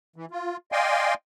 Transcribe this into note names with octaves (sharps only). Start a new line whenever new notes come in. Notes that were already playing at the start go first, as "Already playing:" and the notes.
E3
F4
D5 D#5 F5 G5 G#5 C6